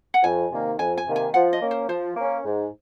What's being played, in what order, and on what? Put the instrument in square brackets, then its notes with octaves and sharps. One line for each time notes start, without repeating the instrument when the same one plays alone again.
[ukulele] F#5
[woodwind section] F2 [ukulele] G#5
[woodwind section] C3 D#3 A#3
[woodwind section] F2 [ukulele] G#5
[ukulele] G#5
[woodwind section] C3 D#3 A#3
[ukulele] G#5
[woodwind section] F3 [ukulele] F#5
[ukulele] D#5
[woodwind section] A#3 C#4
[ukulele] C5
[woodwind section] F3 [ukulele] C5
[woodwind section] A#3 C#4
G#2